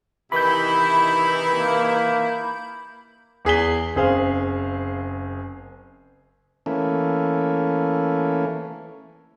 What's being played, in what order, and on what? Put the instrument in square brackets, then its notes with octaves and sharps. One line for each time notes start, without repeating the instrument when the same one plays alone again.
[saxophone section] C3 D#3 E3 [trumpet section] D#4 E4 [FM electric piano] B5 G6
[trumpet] A#3
[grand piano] E2 G#4 B6 G7
F#1 C4 G#4 C5 F5
[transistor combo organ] E3 A3 A#3 C#4